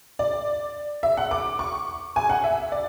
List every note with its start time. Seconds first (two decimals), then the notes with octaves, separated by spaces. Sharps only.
0.19 D5
1.03 E5
1.17 F#5
1.31 D6
1.59 C#6
2.16 G#5
2.29 F#5
2.44 E5
2.72 D5